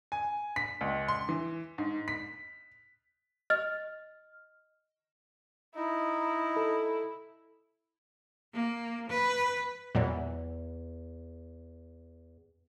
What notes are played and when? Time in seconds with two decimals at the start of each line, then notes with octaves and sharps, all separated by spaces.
0.12 G#5
0.56 B6
0.81 C#2
1.08 C6
1.29 E3
1.78 G#2
2.08 B6
3.50 D#5 F6
5.75 D#4 E4
6.56 A4
8.53 A#3
9.10 B4
9.95 E2 A#2 F#3 G3